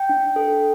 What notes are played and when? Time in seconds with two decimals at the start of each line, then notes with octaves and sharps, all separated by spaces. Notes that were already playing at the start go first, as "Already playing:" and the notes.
Already playing: G5
0.09 D4
0.36 A4